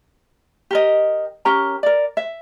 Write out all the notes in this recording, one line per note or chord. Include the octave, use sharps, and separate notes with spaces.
G4 A#4 D#5
C#4 G4 A#4 A#5
A#4 D5
E5